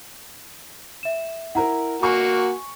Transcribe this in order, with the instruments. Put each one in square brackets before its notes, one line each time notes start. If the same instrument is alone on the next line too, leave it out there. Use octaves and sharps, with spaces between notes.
[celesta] E5 E7
[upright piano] E4 A#4 [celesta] F#5 A#5
[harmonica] A#3 F#4 [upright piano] G#5 C#6